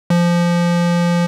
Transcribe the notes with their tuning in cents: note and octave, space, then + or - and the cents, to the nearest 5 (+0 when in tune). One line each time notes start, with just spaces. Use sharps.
F3 -15